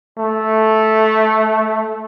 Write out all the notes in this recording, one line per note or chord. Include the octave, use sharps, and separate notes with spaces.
A3